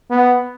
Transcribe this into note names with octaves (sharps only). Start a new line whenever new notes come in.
B3